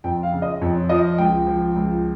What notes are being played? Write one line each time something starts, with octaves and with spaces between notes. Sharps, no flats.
F2 G5
F5
C#3
D#5
F2 C#5
F3 D#5
C#2 G5
F3
C#2